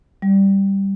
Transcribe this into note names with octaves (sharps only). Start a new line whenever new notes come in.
G3